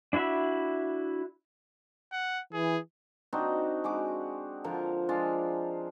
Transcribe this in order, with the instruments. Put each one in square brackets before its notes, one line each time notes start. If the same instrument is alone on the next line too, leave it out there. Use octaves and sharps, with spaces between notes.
[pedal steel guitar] D4 E4 F#4 E5 B5
[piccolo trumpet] F#5
[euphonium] E3 [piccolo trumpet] G#4
[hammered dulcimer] C4 D4 D#4 F#4
G#3 F#4 D6
D3 F3 A#4
G#3 D4 F4